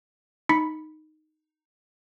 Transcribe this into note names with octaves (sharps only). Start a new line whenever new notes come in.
D#4 B5 B6 C#7